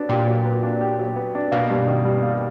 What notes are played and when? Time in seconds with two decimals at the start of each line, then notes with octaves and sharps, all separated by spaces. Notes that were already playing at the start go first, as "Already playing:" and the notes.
Already playing: F#3 B3 D4
0.09 A#2 G4
0.27 F#3
0.45 B3
0.63 D4
0.81 G4
0.99 F#3
1.16 B3
1.35 D4
1.52 B2 A#3
1.70 G2
1.88 D#3
2.05 G3
2.23 A#3